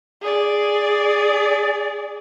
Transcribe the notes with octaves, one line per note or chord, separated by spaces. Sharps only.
G#4 D5